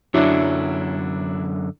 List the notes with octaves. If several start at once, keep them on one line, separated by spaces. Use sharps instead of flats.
F#2 D3 F#3 D4 E4